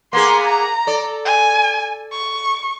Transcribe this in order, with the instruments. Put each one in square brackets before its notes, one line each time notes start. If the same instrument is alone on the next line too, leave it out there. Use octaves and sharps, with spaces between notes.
[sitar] A#3 B3 G#4 [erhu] C6
[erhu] A#5
[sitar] A4 D5
[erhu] G#5
C#6